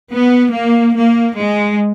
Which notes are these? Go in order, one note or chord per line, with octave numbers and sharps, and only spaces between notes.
B3
A#3
A#3
G#3